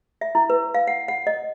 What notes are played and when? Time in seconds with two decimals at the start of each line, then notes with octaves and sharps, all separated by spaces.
0.21 E5
0.35 E4
0.50 B4
0.74 F5
0.87 F#5
1.08 F#5
1.27 D#5